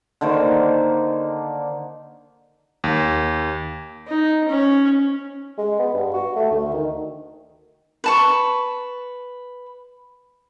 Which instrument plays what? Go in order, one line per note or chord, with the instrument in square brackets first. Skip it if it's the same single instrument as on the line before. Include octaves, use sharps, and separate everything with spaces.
[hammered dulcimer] D3 D#3 A#3 C5
[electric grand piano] D#2
[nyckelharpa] D#4
C#4
[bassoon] G#3
B3
G2
F#4
A3
D2
D#3
[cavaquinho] B4 A5 C#6